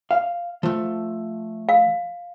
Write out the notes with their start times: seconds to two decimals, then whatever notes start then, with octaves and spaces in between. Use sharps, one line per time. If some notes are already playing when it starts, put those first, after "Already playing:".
0.11 F5
0.63 F3 A3
1.69 F5